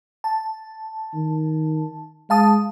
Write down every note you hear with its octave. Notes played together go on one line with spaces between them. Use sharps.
A5
D#3
G#3 F5 A5 D#6